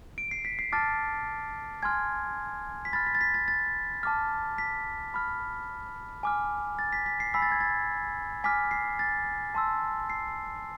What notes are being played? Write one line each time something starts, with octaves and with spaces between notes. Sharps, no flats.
D7
C7
B6
C7
A5 D6 F6 A6
G#5 C6 F6 G#6
B6
B5 F6 A6
B6
A6
B6
A6
A6
A5 D6 F6
B6
B5 F6
G#5 D6 F6
A6
B6
B6
C7
G#5 B5 E6 B6
A6
G#6
A6
G#5 D6 F6 B6
C7
A6
A5 C6 E6
C7